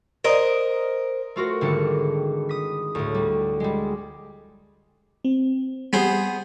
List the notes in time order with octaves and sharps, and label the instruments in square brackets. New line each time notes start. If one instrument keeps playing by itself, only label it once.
[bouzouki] A#4 C5 D#5
[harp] A3 F4 F#4 A#4
G#1 D3 G3 D4 E4 C#7
D#6 B6
D2 A2
G3
G3 G#3
[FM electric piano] C4
[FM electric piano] G3 G4 [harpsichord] B3 G#4 C5